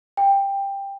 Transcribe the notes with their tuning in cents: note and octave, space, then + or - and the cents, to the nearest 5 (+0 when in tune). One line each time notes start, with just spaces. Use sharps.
G5 +15